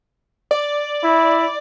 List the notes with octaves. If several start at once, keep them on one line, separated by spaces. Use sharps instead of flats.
D5
E4